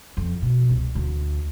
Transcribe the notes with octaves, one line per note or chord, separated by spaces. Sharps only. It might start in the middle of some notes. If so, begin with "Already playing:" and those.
F2
B2
C2
D2